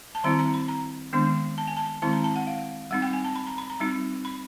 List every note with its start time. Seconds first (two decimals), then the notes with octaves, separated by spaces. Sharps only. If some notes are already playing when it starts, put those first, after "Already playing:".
0.15 A5
0.24 D#3 G3 C4 E4 A#5
0.39 A#5
0.54 B5
0.68 A#5
1.13 D#3 G#3 B3 D4
1.58 A5
1.68 G#5
1.77 A5
2.02 D#3 G#3 C4 E4 A5
2.13 A#5
2.24 A5
2.36 F#5
2.47 F5
2.91 G3 C4 D#4 F#5
3.02 G5
3.13 G#5
3.24 A5
3.36 B5
3.47 A#5
3.58 B5
3.70 A#5
3.80 G3 C4 D#4
4.25 B5